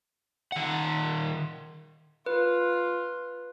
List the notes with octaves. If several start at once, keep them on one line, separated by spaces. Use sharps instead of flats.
D#3 F#5
F4 B4